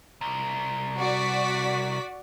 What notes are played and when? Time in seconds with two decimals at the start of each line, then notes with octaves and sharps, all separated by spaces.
0.21 C2
0.98 F#4 D5 B6